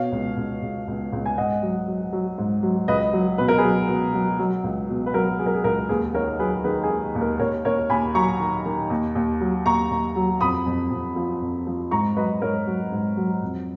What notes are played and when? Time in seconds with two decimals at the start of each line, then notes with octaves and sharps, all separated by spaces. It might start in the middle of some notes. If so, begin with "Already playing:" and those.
Already playing: B2 C#5 F5
0.12 C#2
0.37 C#2
0.62 C#2
0.88 C#2
1.12 C#2
1.26 G#5
1.37 G#2 D#5 F#5
1.63 F#3
1.87 F#3
2.13 F#3
2.38 G#2
2.63 F#3
2.88 C#2 B4 D#5
3.13 F#3
3.38 B2 B4
3.48 A#4
3.58 G#4 B4
3.63 F#3
3.89 B2
4.14 F#3
4.39 F#3
4.64 C#2
4.89 B2
5.06 B4
5.14 F#3 A#4
5.39 F#3 G#4
5.46 A#4
5.54 G#4
5.64 C#2 A#4
5.89 D#2 G#4 B4
6.14 D#3 A#4 C#5
6.39 F#3 G#4 B4
6.64 D#3 G#4 B4
6.83 G#4
6.90 D#3
7.15 D#2
7.21 A#4
7.40 D#2 A#4 C#5
7.65 D#2 A#4 C#5
7.90 D#2 G#5 B5
8.15 F#3 A#5 C#6
8.40 D#3
8.65 D#3
8.90 D#2
9.15 D#2
9.41 F#3
9.66 D#2 A#5 C#6
9.90 D#2
10.16 F#3
10.41 F2 B5 D#6
10.66 F2
10.91 F2
11.16 F3
11.41 F2
11.67 F3
11.91 G#2 A#5 C#6
12.16 F#3 B4 D#5
12.41 G#2 A#4 C#5
12.67 F#3
12.92 G#2
13.17 F#3
13.42 F2